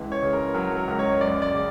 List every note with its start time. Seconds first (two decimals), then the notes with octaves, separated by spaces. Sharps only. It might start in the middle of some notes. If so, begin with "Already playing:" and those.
Already playing: C#2 E3
0.12 C#5
0.23 C#3
0.33 A#4
0.54 F#3 A#4
0.77 A#4
0.88 C#2
0.99 C#5
1.21 F#2 D5
1.42 D5
1.53 C#3